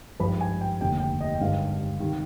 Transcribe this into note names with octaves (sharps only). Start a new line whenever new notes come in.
G#1 G2 F3 B5
G#5
G5
F1 D#2 D3 G5
G5
D#5
G5
G#1 G2 D3 F5
C3 D#3 G3